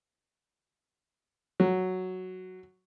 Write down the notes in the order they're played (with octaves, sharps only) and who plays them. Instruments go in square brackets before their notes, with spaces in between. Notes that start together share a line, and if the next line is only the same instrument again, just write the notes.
[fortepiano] F#3